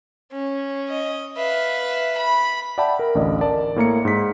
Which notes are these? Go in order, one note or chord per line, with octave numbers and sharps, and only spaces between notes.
C#4
D#5
B4 E5 F5
B5
D5 E5 F#5 G5 A5 B5
A#4
A1 D2 D5 D#5
A#4 D5 A5
A2 A#3 A#5 C#7
G#2 B6